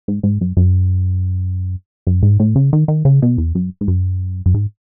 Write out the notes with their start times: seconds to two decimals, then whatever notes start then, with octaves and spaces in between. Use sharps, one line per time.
0.08 G#2
0.23 G#2
0.41 F#2
0.57 F#2
2.07 F#2
2.23 G#2
2.40 A2
2.56 C#3
2.73 D#3
2.88 D#3
3.05 C#3
3.22 B2
3.38 E2
3.55 F#2
3.81 G#2
3.88 F#2
4.46 F#2
4.54 G#2